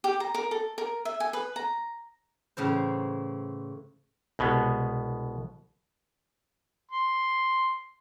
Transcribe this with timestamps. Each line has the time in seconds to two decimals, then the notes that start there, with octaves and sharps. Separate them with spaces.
0.04 G4
0.20 A#5
0.35 A#4
0.51 A4
0.78 A#4
1.05 E5
1.20 G#5
1.33 B4
1.56 A#5
2.57 A2 C#3 E3 C5
4.39 C2 B2 G#3 B3
6.92 C6